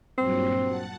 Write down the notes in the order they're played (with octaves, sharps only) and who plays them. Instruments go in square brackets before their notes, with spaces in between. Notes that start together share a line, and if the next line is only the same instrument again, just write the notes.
[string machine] G2 A#2 F#3 [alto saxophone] C4
[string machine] F#5 A5